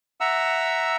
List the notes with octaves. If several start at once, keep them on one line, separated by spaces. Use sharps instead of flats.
E5 F#5 A#5 E6